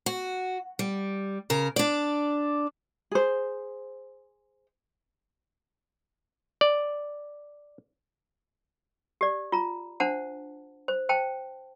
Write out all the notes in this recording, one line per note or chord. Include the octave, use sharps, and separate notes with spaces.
F#4
G3
C#3 A#4
D4 D5
G#4 C5
D5
G4 D5
F4 A#5
D4 C5 F#5 A5
C5
C5 G5 A5